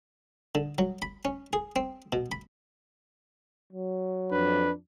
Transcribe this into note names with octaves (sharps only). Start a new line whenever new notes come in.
D3
F#3
B5
C#4
G#4
C4
B2
B5
F#3
F2 D4 B4